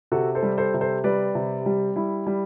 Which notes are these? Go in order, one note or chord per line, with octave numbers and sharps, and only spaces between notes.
C3 F#4 A4
A4 C5
G3
A4 C5
C3
A4 C5
G3 B4 D5
C3
G3
G3 E4
G3